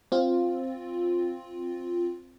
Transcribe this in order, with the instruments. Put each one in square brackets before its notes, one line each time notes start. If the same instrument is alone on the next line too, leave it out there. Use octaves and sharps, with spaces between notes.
[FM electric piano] C4 F4